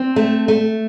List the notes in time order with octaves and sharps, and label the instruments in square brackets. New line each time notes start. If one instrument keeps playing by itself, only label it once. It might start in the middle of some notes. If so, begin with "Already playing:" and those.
Already playing: [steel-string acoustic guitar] C4
A3
A3